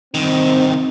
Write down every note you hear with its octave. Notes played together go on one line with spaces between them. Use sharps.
C2 D#3 C4